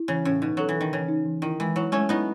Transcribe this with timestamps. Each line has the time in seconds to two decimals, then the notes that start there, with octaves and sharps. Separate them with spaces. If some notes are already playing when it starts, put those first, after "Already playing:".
Already playing: E4
0.08 C#3 E3
0.25 A2 C#4
0.42 B2 D#4
0.57 F#3 A4
0.69 E3
0.75 A4
0.81 D#3
0.92 C#3 E3
1.08 D#4
1.26 E3
1.42 D#3 E4
1.60 E3 G#3
1.75 F#3 E4
1.92 G#3 A3 C#4
2.09 B3 D#4 E4